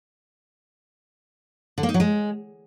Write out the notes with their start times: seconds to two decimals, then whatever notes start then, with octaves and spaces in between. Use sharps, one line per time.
1.78 D3
1.83 A#3
1.89 D#4
1.94 F#3
2.00 G#3